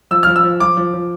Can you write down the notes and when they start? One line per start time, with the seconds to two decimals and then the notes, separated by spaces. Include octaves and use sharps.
0.11 F3 E6
0.23 F3 F6
0.36 E6
0.43 F3
0.60 F3 D6
0.77 F3
0.94 F3